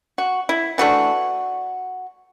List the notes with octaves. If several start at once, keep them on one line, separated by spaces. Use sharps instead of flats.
F#4
E4
E3 A3 D4 F#4